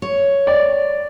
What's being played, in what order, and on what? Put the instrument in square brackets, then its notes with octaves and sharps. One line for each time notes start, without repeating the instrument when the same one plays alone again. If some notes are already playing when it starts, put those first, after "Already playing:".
[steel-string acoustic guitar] C#5
[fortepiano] D5